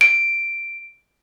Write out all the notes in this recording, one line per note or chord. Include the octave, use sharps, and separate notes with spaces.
D7